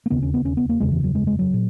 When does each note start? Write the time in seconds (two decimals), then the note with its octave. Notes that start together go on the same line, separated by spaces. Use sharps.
0.06 A#3
0.10 E1 D#2 C#3 B3
0.22 C#4
0.34 B3
0.45 C#4
0.57 B3
0.69 A#3
0.80 F#1 E2 C#3 G#3
0.92 E3
1.04 F#3
1.15 G#3
1.27 G#3
1.39 F#3
1.53 A#2